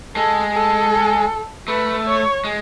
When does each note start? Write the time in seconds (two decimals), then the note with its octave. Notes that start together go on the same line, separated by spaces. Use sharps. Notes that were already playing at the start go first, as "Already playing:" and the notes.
0.16 G#3 A4
0.54 A4
1.68 A3 B4
2.06 C#5
2.45 G#3